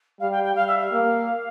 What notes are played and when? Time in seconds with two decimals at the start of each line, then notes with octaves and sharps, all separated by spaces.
0.20 G3 F5
0.31 G5
0.43 G5
0.55 G3 F5
0.67 E5
0.79 F5
0.92 A#3